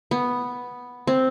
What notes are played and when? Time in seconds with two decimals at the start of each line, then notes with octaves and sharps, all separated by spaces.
0.11 B3
1.07 C4